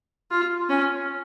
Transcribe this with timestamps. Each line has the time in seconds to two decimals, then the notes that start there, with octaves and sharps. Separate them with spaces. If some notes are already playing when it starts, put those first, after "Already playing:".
0.31 F4
0.69 C#4